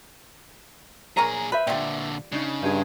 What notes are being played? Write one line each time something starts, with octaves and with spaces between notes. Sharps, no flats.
A#2 G#4 A#4 C#5 G#5 A#5
B4 C5 E5 B5
A#2 D3 G3 F4
C#3 D4 D#4
G2 D#4 G#4